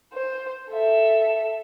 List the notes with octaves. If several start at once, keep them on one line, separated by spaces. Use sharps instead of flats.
C5
A4 E5